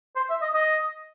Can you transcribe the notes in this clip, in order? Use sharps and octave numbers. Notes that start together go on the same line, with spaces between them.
C5
E5
D#5
D#5